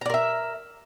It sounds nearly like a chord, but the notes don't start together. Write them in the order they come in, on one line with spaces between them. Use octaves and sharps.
A#5 D5 A#4 E5